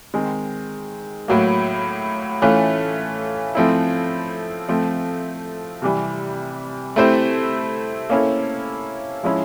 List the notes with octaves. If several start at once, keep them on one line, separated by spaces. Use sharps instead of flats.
D#3 G#3 C4
A2 F#3 A#3
E3 A3 C#4 F4
F3 A3 C4 E4
F3 A3 C4
C3 E3 G3
A3 C4 E4 G4 C5
A#3 C#4 E4 A4
F3 G#3 C#4 E4